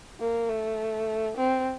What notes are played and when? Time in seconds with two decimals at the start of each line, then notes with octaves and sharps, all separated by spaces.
0.20 A#3
0.49 A3
1.37 C4